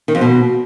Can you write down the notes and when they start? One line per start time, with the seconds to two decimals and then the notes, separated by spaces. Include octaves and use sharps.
0.08 D#3
0.15 F2
0.21 B2